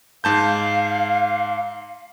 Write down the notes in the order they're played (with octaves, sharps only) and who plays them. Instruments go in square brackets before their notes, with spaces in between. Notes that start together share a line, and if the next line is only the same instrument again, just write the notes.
[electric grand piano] G#2 A5 G6 [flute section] F5